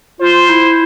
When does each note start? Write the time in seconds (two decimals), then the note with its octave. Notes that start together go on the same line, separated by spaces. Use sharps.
0.20 F4 C5
0.50 E4